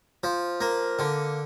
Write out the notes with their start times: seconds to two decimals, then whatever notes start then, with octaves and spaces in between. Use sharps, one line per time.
0.23 F3
0.61 A#3
0.99 D3